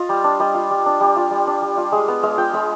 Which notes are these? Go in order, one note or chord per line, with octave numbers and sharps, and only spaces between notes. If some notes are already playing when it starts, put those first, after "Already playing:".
Already playing: F4 D#5
G3
D4
G3 D#5
F4
G3
D4
G3
F4
G3
D4
G3
F4
G#3 G#4
B3
G#3 F5
F4 G5
G#3 B5